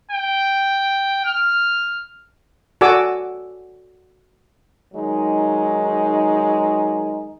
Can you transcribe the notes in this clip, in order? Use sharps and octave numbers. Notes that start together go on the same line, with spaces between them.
G5
F6
F#4 A4 D5 G#5 D6 E6
D#3 F#3 G#3 D#4